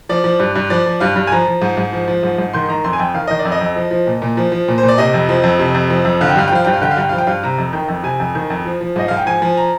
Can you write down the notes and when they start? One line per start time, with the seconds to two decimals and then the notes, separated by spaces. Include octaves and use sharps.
0.09 F3 D5
0.24 F3
0.40 G2
0.55 G2
0.70 F3 D5
0.86 F3
1.00 G2 F5
1.16 G2
1.27 G#5
1.31 F3 A#5
1.47 F3
1.62 G#2
1.77 G#2
1.93 F3
2.08 F3
2.23 G#2
2.38 G#2
2.53 D#3 C6
2.69 D#3 A#5
2.84 F2 C6
2.93 G#5
2.99 F2 G5
3.14 D#3 F5
3.27 D#3 D#5
3.39 D5
3.45 F2
3.52 D#5
3.61 F2
3.76 F3
3.91 F3
4.07 A#2
4.22 A#2
4.37 F3
4.52 F3
4.68 A#2
4.78 C5
4.83 A#2
4.88 D5
4.98 C3 D#5
5.14 F2
5.29 F3
5.43 F2
5.59 C3
5.75 F2
5.90 F3
6.05 F2
6.21 D3 F5
6.29 G5
6.36 G2 F5
6.48 G5
6.52 F3 F5
6.65 G2 G5
6.73 F5
6.81 D3 G5
6.91 F5
6.96 G2 G5
7.09 F3 F5
7.18 G5
7.27 G2 F5
7.43 C3 A#5
7.58 F2
7.73 D#3 G5
7.88 F2
8.03 C3 G#5
8.20 F2
8.35 D#3
8.50 F2
8.66 F3
8.81 F3
8.96 G#2 D#5
9.08 G#2 F5
9.17 G5
9.26 F3 G#5
9.42 F3
9.57 A#5